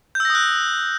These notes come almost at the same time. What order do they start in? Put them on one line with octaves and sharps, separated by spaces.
G6 E6 A#6 D#6 F#6